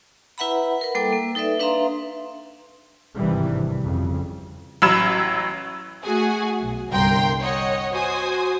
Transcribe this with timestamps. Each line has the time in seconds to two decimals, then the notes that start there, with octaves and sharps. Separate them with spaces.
0.38 E4 B4 E5 F#5 A#5 B5
0.81 A#4 B4
0.95 G3 A#3 A4 G5 D6
1.13 A#3
1.35 D#4 A4 B4 D5 E5
1.59 D4 B4 E5 F5 A#5 C6
3.15 G#1 G2 C3 D#3 E3 G3
3.53 C3
3.84 F2 C#3 G3
4.82 A1 F#3 B5 E6 G#6 E7
6.04 A3 F#4 G#4 F#5 G#5
6.61 B1
6.91 G1 C2 A#4 G5 C6
7.41 C#5 D#5 F#5
7.93 F#4 C5 G#5 D#6